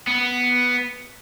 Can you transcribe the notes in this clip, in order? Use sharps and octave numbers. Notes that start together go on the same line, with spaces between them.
B3